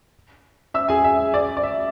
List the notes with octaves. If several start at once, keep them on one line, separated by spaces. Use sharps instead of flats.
E5 E6
G#4 G#5
E5
D5
D5
E5